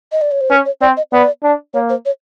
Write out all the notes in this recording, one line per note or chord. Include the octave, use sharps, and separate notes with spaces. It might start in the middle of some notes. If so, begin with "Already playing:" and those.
D#5
D5
C#5
C5
C#4 B4
C#5
C4 D5
D#5
B3 D5
D4
A#3 C#5
C5
C#5